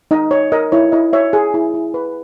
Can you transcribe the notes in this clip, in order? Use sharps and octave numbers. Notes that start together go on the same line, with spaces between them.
D#4 D#5
C#5
A#4 D#5
E4 C#5
E4 D#5
C#5 E5
G#4
E4
E4
B4